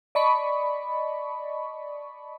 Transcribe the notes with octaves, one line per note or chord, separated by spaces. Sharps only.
D5 D#5 A5 B5 C#6